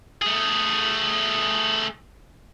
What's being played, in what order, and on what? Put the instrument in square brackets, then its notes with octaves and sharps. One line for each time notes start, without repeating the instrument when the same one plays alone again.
[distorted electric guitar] A3 G#4